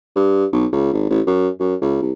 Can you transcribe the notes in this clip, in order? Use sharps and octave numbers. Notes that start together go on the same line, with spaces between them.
G2
B1
C#2
G#1
A1
F#2
F#2
C#2
C2